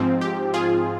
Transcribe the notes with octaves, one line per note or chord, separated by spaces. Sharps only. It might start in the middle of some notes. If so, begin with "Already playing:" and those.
Already playing: G#2 F3 C4
G4
F4 G#4